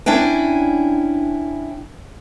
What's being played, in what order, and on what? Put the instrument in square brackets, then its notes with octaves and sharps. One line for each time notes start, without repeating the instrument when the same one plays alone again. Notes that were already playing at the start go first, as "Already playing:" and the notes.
[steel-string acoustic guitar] C#4 D4 E4 G5 G#5